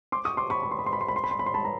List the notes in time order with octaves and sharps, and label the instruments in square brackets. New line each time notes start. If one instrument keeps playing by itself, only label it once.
[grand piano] C6 D6
C#6 D#6
C6 D6
B5 C#6
B5
C6
B5
C6
B5
C6
B5
C6
B5
C6
B5
C6
A5 B5
A#5